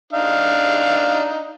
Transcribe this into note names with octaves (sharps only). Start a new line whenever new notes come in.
D4 D#4 F5